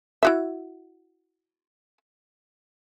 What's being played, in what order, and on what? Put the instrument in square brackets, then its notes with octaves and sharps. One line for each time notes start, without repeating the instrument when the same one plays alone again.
[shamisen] E4 F#4 E5